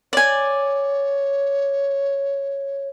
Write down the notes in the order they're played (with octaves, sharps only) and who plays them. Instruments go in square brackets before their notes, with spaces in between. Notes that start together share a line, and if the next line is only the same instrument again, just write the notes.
[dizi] C#5 [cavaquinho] D5 G#5